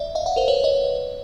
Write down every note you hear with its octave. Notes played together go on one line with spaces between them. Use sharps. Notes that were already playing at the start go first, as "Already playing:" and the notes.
Already playing: D5 E5
D#5 F5
E5 F#5
A#4 C5
B4 C#5
C#5 D#5